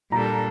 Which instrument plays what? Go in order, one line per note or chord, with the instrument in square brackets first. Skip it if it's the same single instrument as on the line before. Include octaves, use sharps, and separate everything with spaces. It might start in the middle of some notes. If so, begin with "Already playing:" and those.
[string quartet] A#2 G3 D4 A4 [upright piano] A#5